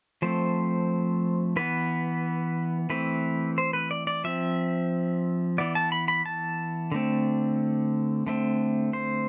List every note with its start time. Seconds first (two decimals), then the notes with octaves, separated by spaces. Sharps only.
0.22 F3 A3 C4 C5
1.56 E3 B3 B4
2.90 E3 A3 C4 B4
3.58 C5
3.73 B4
3.91 D5
4.07 D5
4.24 F3 C4 E5
5.58 E3 B3 D5
5.75 A5
5.92 B5
6.08 B5
6.26 A5
6.92 D3 A3 C4
8.27 D3 A3 C4
8.93 C5